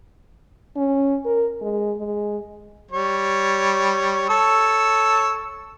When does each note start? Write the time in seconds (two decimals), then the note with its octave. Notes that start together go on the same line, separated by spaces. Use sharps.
0.76 C#4
1.25 A#4
1.62 G#3
1.97 G#3
2.91 G3 C#5
4.29 A4 C#5 E6